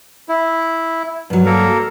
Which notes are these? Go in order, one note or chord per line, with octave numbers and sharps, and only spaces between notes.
E4
G2 F#3
A#3 A4 A#4